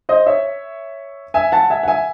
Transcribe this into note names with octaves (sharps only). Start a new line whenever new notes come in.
C5 D#5
C#5 E5
E5 G#5
F#5 A5
E5 G#5
F#5
E5 G#5